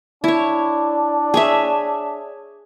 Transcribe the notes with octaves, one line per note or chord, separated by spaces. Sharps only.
D4 E4 C#5
G#4 C#5 E5